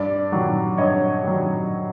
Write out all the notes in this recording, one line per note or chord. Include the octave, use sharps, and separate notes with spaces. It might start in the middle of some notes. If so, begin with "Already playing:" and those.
Already playing: G2 D5
D#3 F#3
G2 C#5 D#5
D#3 F#3